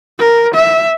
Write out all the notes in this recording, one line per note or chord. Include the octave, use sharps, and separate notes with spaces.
A#4
E5